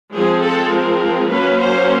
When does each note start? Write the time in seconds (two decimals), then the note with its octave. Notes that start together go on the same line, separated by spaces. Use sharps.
0.14 F3 G#3 C4 G#4
0.44 A4
0.72 A#4
1.30 F#3 A#3 C#4 B4
1.60 C5